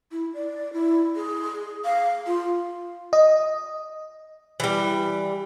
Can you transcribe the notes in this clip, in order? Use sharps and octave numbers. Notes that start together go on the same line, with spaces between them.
E4
D5
E4
G#4
F5
F4
D#5
E3 G3